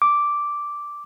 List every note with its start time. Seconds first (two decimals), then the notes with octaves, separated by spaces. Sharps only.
0.02 D6